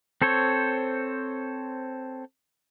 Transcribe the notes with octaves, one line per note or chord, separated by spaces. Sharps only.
C4 A4 C5 C#5